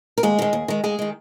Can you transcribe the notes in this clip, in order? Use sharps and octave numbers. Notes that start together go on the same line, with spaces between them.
A#4
D#2 G#3 G#4
D#3 G#3
D#2
D#3 G#3
D#2 G#3 G#4
D#3 G#3